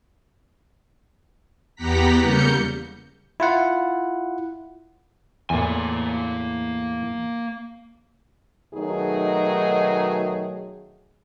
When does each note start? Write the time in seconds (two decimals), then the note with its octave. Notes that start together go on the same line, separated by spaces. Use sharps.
1.75 E2 B3 G4 F#5 A#5 B6
2.21 C#3 G3 A#3 G6 C#7
3.40 E4 F4 F#5
5.50 E2 A2 A#3 G#5
8.74 B2 D#3 F#3 A3 D#4 G#4